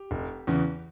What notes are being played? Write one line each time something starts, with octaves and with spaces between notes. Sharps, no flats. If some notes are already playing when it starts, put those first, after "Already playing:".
Already playing: G4
F1
E2 C#3 E3